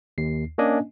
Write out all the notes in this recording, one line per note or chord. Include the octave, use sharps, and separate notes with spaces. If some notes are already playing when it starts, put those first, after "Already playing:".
D#2 C7
A#3 C#4 D4 D#5 G#5